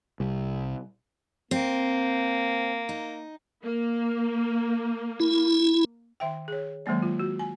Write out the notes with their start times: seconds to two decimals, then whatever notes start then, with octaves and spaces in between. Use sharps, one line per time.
0.20 C2
1.51 A#3 C4
2.89 D#4
3.63 A#3
5.20 E4
6.20 D#3 E5 G5
6.48 G#4 C#5
6.86 D#3 F#3 G#3 A#3 D5
7.02 F4
7.19 F#4
7.39 G#5